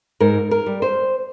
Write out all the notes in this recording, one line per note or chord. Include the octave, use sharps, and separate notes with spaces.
G#2 A#4
A#4
G3
C5